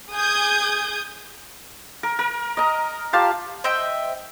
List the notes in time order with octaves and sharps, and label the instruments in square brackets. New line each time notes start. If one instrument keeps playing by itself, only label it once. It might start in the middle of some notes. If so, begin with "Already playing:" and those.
[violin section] G#4 D#6 G6 G#6
[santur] A#4
A#4
D#5 A#5
F4 G4 F5 A5
[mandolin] C5 D#5 E5 G5